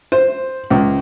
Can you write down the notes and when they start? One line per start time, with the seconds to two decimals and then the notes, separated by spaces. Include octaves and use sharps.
0.12 C5
0.70 C#2